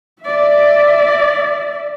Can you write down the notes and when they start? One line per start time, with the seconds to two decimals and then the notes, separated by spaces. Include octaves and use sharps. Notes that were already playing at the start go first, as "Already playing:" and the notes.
0.22 D5 E5